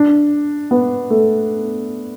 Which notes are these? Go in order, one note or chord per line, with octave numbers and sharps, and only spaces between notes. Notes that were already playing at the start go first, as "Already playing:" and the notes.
Already playing: D4
B3
A3